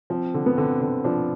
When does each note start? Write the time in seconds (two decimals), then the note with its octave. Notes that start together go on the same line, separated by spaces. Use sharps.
0.10 F3 C4
0.34 D3
0.46 B3
0.57 D3 C4
0.81 D3
1.04 F3 D4